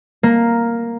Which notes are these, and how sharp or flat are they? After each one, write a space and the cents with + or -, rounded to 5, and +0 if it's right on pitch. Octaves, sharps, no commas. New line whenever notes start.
A#3 +0